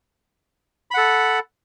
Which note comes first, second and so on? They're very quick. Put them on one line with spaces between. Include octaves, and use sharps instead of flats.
B5 F#5 A4